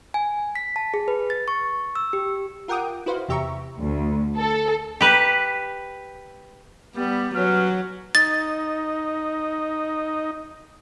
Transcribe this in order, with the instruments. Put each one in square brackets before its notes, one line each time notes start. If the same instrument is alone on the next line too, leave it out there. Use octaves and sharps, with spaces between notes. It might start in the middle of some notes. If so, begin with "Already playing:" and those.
[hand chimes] G#5
B6
A5
G#4
B4
A6
C#6
E6
G4
[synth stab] F4 A#4 F#5 G5 D6 D#6
E4 F#4 B4 C5 F5
E2 C3 G4 E5 A#5 C#6
[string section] D2
A4
[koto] G4 B4
[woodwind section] G3 [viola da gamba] B3
[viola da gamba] F#3 [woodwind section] C#4 B4 F6
[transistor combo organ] D#4 [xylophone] A6